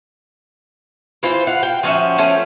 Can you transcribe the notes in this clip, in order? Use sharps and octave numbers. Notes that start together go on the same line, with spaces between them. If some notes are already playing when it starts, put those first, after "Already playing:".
E3 F4 C5
F5 F#5
G5
F3 C#4 F#4 E5
F3 A3 C#4